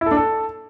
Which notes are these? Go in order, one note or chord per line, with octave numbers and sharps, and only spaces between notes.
E4
A4
D4
A4